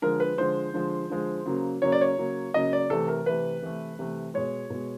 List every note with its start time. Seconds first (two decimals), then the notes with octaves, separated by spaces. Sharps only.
0.02 D3 F3 G#3 A#4
0.20 B4
0.38 D3 F3 G#3 C5
0.74 D3 F3 G#3
1.10 D3 F3 G#3
1.46 C#3 F#3 A#3
1.82 C#3 F#3 A#3 C#5
1.92 D5
2.01 C#5
2.18 C#3 F#3 A#3
2.54 C#3 F#3 A#3 D#5
2.73 D5
2.90 C3 E3 A3 A4
3.08 A#4
3.26 C3 E3 A3 B4
3.62 C3 E3 A3
3.99 C3 E3 A3
4.34 B2 G#3 C#5
4.70 B2 G#3